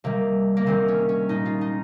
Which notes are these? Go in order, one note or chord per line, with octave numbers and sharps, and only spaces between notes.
C3 D#3 G3 A#3
A#3
C3 D#3 G3 C4
C#4
C#4
A#2 G#3 D#4
F4
D#4